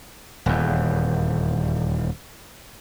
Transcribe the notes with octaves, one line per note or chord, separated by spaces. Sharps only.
D#1 E2